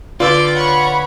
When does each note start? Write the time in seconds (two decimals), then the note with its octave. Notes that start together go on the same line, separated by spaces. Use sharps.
0.20 D3 F4 B4 D5 G5 E6
0.56 C#5 F#5 B5 C#6